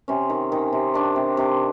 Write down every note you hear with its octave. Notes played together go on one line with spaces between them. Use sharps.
C3 C#4
D#3
D#3
C3
D#3 D4
C3
C3